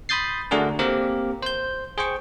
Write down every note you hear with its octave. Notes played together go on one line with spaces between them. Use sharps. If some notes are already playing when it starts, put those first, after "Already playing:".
B5 C6 D#6 G6 A6 C7
D3 A3 D4 F#4 G#4 A#4
A#3 C4 G4 A#4
C5 G6
G#4 C5 G5 C#6